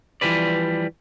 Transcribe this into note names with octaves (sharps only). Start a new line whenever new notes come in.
E3 F3 G3 B4 D5